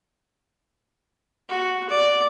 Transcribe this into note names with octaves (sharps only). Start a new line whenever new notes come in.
F#4
D5